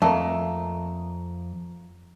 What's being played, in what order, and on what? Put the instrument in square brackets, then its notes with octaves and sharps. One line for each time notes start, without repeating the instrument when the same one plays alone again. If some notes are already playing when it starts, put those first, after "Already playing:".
[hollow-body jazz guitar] F2 [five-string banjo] A3 A#3